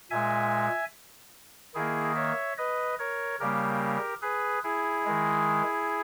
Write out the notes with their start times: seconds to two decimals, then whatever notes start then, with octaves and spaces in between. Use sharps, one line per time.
0.11 A#2 G#3 E5 G#5
1.75 D#3 A#3 E4 G#4
2.16 C#5 E5
2.58 B4 D#5
2.99 A#4 C#5
3.40 C#3 G3 A#3 G4 A#4
4.22 G#4 B4
4.63 E4 G#4
5.05 D#3 G#3